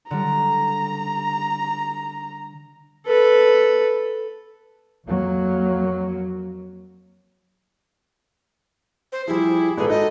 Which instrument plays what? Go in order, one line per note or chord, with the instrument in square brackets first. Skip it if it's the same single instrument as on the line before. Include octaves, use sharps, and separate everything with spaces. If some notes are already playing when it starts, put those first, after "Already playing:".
[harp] D3 G3 [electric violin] A#5
[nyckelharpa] A4 B4
[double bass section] F2 F#3 A#3
[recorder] C5
[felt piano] F3 G3 [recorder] E4 [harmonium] G4 G#4
[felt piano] G#1 A#2 B4 [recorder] G#4 [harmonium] A4
[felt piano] D#4 F#4 [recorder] D#5